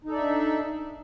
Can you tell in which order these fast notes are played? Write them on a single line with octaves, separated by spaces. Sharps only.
D#4 A4 D5 E5 D4